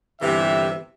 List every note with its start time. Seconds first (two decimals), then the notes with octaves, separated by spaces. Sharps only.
0.21 G1 C3 E3 G4 E5